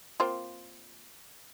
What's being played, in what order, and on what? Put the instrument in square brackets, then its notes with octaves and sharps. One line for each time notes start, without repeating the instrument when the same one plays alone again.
[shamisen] A#3 C4 F4